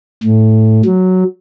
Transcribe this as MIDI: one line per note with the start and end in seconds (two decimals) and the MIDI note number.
0.24 0.82 45
0.85 1.24 54